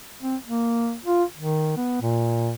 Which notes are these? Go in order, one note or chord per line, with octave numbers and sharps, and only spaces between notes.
C4
A#3
F4
D#3
B3
A#2